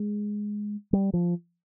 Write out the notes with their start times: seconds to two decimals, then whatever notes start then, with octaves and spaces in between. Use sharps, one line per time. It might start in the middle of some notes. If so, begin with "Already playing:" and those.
Already playing: G#3
0.93 G3
1.14 F3